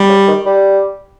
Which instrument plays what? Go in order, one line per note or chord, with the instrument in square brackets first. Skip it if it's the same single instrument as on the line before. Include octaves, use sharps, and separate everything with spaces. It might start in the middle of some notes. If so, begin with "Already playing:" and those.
Already playing: [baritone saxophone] G3
[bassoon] C#3
D#3
G3